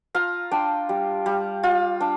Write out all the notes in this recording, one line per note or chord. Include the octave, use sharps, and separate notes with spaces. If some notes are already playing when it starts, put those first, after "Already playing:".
F4 F5 A#5
D4 G5 C6
G3
G3
F4
D4